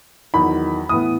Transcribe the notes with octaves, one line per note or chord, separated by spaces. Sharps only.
E2 D#3 F#3 B5
A2 E3 B3 D#6